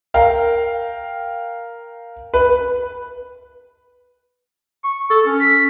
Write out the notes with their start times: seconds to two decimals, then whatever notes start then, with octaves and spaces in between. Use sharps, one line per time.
0.14 A#4 F5 G5
2.34 B4
4.84 C#6
5.10 A4
5.26 C#4
5.40 B6